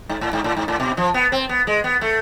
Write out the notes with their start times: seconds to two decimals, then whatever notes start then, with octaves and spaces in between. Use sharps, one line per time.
0.09 G#2
0.21 A2
0.33 G#2
0.44 A2
0.56 G#2
0.68 A2
0.80 B2
0.97 F3
1.14 B3
1.32 C4
1.49 B3
1.67 G#3
1.84 B3
2.01 A3